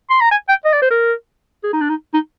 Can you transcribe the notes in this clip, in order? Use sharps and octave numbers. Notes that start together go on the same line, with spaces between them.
C6
A#5
G#5
G5
D#5
D5
C5
A#4
G#4
D#4
D4
D#4
D#4